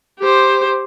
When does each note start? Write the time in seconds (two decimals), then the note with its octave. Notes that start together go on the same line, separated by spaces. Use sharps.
0.20 G4 C5